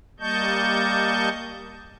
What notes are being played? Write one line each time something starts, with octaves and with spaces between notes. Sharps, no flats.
G3 A#3 D#5 A5 C#6 G6